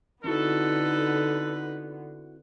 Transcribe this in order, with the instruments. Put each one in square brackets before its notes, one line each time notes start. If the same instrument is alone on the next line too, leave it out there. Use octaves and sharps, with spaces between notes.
[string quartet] D3 B3 [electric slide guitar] C4 E4 F#4 [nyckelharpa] D#4 B4 [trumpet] A4